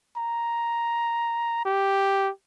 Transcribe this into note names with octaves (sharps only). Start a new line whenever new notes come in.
A#5
G4